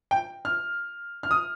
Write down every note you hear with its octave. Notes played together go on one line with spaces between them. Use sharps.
G5
F6
F6
D#6